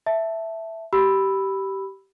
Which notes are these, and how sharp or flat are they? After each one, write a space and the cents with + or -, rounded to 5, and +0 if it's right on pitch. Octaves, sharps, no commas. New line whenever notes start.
E5 +0 A5 +0
G4 -20 B5 +0 E6 +0